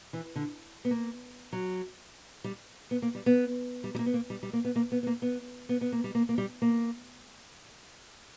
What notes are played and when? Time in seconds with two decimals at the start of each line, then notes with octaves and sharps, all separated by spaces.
0.13 E3
0.36 D3
0.85 B3
0.91 A#3
1.53 F#3
2.44 G3
2.91 B3
3.02 A#3
3.15 G3
3.26 B3
3.84 G3
3.95 G3
3.99 A#3
4.06 B3
4.14 A#3
4.30 G3
4.43 G3
4.53 A#3
4.65 B3
4.76 A#3
4.92 B3
5.03 B3
5.07 A#3
5.22 B3
5.69 B3
5.81 B3
5.92 A#3
6.04 G3
6.15 A#3
6.29 A#3
6.38 G3
6.62 A#3